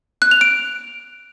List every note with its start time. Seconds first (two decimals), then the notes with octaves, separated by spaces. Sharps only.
0.22 F#6
0.31 F7
0.41 D7